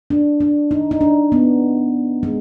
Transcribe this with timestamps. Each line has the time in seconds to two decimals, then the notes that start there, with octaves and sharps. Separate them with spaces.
0.10 D4
0.40 D4
0.71 D#4
0.91 D#4
1.01 D4
1.32 B3
2.23 G#3